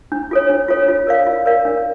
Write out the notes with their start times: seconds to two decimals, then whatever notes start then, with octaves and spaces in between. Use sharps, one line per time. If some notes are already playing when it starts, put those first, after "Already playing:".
0.12 D4
0.31 F4 A4 C#5
0.50 D4
0.68 F4 A4 C#5
0.88 F4
1.07 A#4 D5 F5
1.26 F4
1.46 A#4 D5 F5
1.65 D4